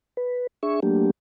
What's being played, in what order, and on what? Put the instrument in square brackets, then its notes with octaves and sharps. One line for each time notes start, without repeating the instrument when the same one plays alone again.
[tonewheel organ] B4
D4 G#4 E5 C#6
F#3 A3 A#3 D4 G4